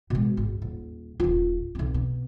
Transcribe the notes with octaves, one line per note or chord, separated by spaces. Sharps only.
B2 G#3
G#1
D#1
D#1 F4
B1 C4
B2